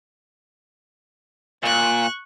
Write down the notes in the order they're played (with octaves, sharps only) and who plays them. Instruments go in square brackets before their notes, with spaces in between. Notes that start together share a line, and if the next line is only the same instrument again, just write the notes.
[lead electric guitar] A#2 [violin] C#6 F#6